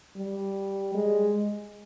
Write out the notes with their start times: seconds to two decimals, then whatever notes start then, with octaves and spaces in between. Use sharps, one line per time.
0.17 G3
0.94 G#3